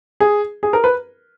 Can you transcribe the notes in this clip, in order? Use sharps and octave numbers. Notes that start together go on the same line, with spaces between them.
G#4
G#4
A#4
B4